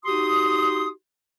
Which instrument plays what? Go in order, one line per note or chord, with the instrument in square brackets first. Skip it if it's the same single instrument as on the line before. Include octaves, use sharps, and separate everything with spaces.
[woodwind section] D#4 F#4 G4 C6 D#6